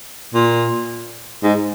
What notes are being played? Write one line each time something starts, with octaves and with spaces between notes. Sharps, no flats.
A#2
G#2